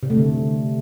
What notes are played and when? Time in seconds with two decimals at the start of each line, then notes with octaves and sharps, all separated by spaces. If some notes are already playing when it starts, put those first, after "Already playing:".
0.03 C3
0.10 A3
0.17 D3